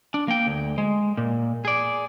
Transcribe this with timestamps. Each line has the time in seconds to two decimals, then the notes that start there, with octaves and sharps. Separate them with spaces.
0.14 D4
0.28 A#3 G5
0.47 D2
0.78 G#3
1.17 A#2
1.65 G#4 D5